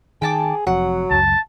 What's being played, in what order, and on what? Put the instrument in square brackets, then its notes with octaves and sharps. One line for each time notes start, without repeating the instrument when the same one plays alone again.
[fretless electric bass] D#3 [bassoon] G#4 [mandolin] G5 A5 D6
[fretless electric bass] F1 F2 [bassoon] F#3 [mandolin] F#5
[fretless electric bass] C#2 F#2 [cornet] A5